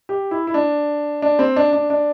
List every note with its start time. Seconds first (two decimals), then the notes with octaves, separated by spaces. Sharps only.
0.09 G4
0.31 E4
0.47 E4
0.54 D4
1.22 D4
1.39 C4
1.56 D4
1.73 D4
1.90 D4